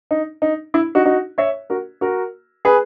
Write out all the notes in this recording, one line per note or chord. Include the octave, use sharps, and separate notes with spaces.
D#4
D#4
E4
D#4 F#4
D#4 F#4
C#5 E5
F#4 A#4
F#4 A#4
G#4 B4